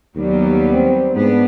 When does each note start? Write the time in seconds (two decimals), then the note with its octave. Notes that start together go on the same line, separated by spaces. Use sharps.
0.16 D#2 F#3 G3 B3
0.73 C4
1.15 G#2 B3 D4